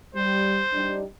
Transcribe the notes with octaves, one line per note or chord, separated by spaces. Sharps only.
G3 C5
G3 D4 D#4